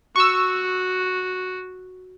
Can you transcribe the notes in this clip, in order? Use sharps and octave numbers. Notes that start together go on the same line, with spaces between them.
F#4 C#6 E6